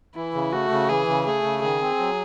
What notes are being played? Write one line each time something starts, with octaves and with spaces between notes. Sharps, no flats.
E3 E4
C#3
A3 F#4
C#3
E3 G#4
C#3
A3 G#4
C#3
D#3 G#4
C4
F#3